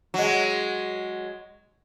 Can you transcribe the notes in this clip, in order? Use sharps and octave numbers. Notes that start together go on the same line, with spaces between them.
F#3 G#3